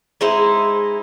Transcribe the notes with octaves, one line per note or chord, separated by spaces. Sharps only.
G#3 D#4 E4 C5